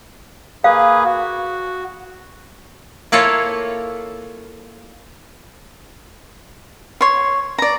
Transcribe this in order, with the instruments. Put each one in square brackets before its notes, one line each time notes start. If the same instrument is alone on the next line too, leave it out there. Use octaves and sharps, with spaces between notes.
[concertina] A#3 G#4 B4 [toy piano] F5
[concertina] F#4
[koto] A#3 E4 F4 A4 C#5
[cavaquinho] C#5 C6
D5 A#5